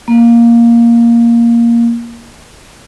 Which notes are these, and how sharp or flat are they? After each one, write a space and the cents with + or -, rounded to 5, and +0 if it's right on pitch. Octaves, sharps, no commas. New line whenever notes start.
A#3 +5